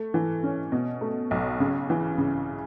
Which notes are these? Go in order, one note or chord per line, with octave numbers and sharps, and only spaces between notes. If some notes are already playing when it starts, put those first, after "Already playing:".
Already playing: A3
E3
C#4
B2
A3
B1
C#3
E3
C#3